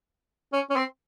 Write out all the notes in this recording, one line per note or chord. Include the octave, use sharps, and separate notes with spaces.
C#4
C#4
C4